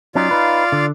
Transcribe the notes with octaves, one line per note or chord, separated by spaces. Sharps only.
F#3 C#4 D#4 F4 D5 F5
D#4 B4
D3